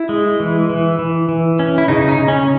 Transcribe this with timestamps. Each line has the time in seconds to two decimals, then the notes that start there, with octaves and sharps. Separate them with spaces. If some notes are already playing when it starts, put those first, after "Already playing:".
Already playing: E4
0.09 G#3
0.40 E3
0.70 E3
0.99 E3
1.29 E3
1.59 C#4
1.78 E4
1.88 C#3 D#4
2.09 D#4
2.19 C#3
2.28 C#4